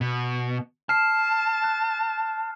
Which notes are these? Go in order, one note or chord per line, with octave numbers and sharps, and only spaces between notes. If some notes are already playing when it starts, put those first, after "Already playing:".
B2
A5 F6 C7 E7
F#6